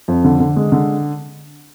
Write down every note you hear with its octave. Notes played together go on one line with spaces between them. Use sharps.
F2
D3
D3
G#3
D3